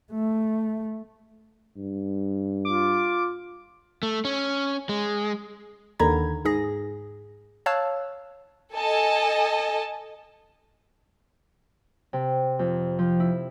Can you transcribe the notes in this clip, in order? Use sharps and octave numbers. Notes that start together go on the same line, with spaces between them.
A3
G2
F4 D6
A3
C#4
G#3
D#2 D3 D#3 A#5 B5 G#6
G#2 G#4 A#6
C#5 F5 A5 E6 F#6
A4 D#5 G#5 A5
C3
F2
F3
E4